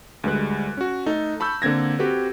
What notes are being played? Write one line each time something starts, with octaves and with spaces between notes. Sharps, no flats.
D2 G3 G#3 B4 F#6
C#4 F#4
A3 D#4 A4
A5 B5 C#6 E6 G6
D3 A#3 C4 G#6 A#6
C4 F#4 G4 A4 B4